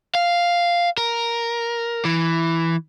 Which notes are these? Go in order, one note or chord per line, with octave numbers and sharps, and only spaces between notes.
F5
A#4
E3